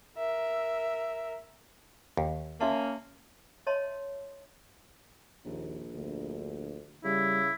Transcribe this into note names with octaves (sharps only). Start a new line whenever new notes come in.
A#4 E5
D#2
A#3 C#4 F#4 E5 A5
C#5 D#5 E5 A5 C6
A#1 D#2
D2
C#3 G3 E4